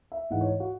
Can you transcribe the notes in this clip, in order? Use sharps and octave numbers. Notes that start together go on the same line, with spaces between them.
E5
G#2 E3 F#5
C#5
F#4